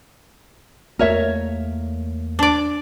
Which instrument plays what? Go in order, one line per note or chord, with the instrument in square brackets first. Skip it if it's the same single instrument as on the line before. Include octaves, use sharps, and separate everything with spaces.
[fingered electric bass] E2 A3 A#3 [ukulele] A#4 C#5 E5
[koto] D4 D5